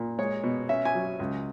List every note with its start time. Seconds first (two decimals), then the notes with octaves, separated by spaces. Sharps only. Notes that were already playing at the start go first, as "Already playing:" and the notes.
Already playing: A#2
0.18 G#3 C#5
0.43 B2
0.69 C#4 E5
0.85 G#5
0.95 F#3
1.20 C#2